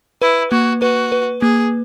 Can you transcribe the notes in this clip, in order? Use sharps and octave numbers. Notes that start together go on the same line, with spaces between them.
E4 B4
A#3 F#4
F#4 B4
B4
A#3 G#4